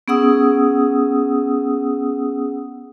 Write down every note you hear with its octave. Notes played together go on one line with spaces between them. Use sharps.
B3 C#4 G#4 F#5 D#6 E6